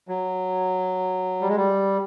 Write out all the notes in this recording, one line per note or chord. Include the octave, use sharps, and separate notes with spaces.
F#3
G3
G#3
G3